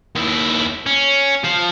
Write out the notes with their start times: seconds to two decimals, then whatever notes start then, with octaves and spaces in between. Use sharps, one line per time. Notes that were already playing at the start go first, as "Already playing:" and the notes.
0.16 D#2 E4
0.86 C#4
1.44 F3 F5